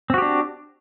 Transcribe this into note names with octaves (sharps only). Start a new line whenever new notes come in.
C4 D4 F#4 G4